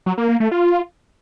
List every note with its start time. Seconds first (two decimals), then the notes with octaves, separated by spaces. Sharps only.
0.06 F#3
0.18 A#3
0.29 A#3
0.40 A3
0.51 F4